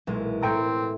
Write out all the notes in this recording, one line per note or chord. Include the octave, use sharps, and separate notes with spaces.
B1 A#2 E3 G#3
A2 C4 E4 A4 A#4 G5 A#5